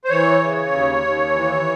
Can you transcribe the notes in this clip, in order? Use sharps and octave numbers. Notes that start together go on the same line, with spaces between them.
C5
E3 C#5
C#3
D#2
D#2
E3